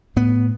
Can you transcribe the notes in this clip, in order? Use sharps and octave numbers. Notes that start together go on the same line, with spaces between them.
A2 B3